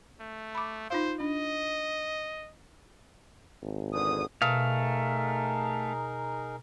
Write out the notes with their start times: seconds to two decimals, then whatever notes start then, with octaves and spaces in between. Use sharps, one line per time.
0.20 A3
0.55 B5 D6
0.90 D#4 F4 C5 F5
1.20 D4 D#5
3.62 G#1
3.93 E2 D3 D#6
4.42 B2 A3 D#4 G#4 A#4 F5